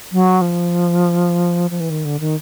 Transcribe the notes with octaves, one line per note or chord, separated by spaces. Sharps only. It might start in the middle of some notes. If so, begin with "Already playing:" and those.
F#3
F3
F3
E3
D#3
D3
D#3